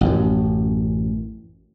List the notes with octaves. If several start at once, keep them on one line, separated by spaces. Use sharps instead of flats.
A1 F#2